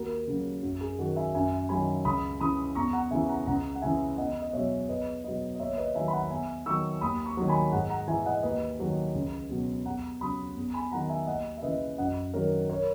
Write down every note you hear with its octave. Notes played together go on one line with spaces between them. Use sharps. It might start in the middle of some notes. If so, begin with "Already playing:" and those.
Already playing: D#2 F#4 A#4
C#3 F#3
F#2 F#4
G#4
D#3 F#3 F#4 A#4
E5 G#5
F#2 E5 G#5
D#3 F#3 G#5 B5
C#2 B5 D#6
C#3 E3 B5 D#6
E2 A#5 C#6
F#5 A#5
C#3 E3 E5 G#5
F#5 A#5
C#2 F#5 A#5
F#5
C#3 E3 E5 G#5
E2 D#5 F#5
D#5
B2 F#3 C#5 E5
E2 B4 D#5
B2 F#3 B4 D#5
D#5
D#2 C#5 E5
B4 D#5
D#3 F#3 E5 G#5
B5
F#5 A#5
E2 E5 G#5
D#3 F#3 C#6 E6
D#2 B5 D#6
A#5 C#6
D#3 F#3
G#5 B5
G#2 F#5 A#5
F#5 A#5
E3 E5 G#5
D#5 F#5
D#2 B4 D#5
D#3 F#3
C#2
B2 F#3
E2 F#5 A#5
C#3 F#3 B5 D#6
E2
G#5 B5
D#3 F#3 F#5 A#5
E5 G#5
D#2 D#5 F#5
E5
C#3 E3 B4 D#5
F#2 D#5 F#5
D#3 F#3 A#4 C#5
A#4 C#5